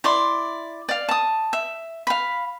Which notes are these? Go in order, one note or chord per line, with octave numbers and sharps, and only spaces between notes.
E4 D5 C6
D5 F5
A5 D#6
E5
F5 B5